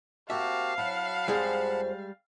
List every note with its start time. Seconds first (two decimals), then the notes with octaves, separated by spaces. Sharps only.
0.30 A#3 C4 F#4 G4 E5 F5 A5
0.78 F#3 E4 F#5 A5 B5
1.28 F2 F3 G3 G#3 C4 G#4